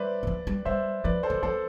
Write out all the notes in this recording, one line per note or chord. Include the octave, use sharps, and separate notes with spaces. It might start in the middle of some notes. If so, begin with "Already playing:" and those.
Already playing: G3 B4 C5 D5 E5
E3
F3
G3
G3 C5 E5
F3 B4 D5
A4 C5
E3
F3 A4 C5